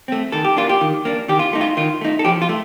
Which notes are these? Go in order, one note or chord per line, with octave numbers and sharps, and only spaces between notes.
A3 C4
D#3 A4
G4
A#3 D4 F4
G4
D#3
A#3 D4
D#3 G4
F4
A3 D#4
F4
D#3 F4
A3 D#4
A4
F3 G4
F4
A3